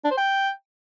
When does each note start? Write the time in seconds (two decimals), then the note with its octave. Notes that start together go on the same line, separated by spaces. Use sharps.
0.04 D4
0.11 C5
0.17 G5